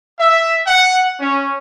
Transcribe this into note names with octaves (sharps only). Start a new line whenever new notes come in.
E5
F#5
C#4